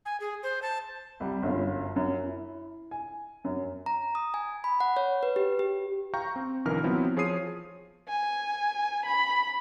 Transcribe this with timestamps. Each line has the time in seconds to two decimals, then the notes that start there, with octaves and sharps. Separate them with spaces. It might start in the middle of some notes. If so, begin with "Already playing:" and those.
0.06 G#5
0.20 G#4
0.43 C5
0.62 A5
1.20 C2 G3
1.43 G1 F#2 F4
1.96 F#2
2.25 E4
2.91 G#5
3.44 F#2
3.86 A#5
4.15 D#6
4.34 G#5
4.64 B5
4.80 F#5
4.97 C#5
5.23 B4
5.36 G4
5.59 G4
6.14 F5 G5 A#5 C#6 G6
6.36 C4
6.65 B1 D3 E3 D#4 A#4 F6
6.84 F3 F#3 B3 C4 E4
7.17 F3 G#4 C#5 D#6 C7 D#7
8.09 G#5
9.06 B5